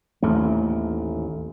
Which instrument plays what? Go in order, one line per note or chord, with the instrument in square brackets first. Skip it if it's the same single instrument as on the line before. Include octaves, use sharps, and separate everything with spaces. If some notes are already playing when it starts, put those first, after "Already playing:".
[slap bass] A1 D#2 G#2 A3